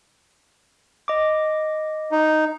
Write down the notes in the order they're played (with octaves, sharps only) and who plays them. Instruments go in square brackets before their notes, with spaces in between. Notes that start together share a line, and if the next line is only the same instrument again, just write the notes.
[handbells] D#5 D6
[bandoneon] D#4